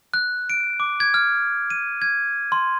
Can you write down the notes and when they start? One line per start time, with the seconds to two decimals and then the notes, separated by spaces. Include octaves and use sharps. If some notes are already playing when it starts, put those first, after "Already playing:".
0.14 F#6
0.50 D7
0.80 D6
1.00 G#6
1.14 F6
1.70 D#7
2.02 G#6
2.52 C6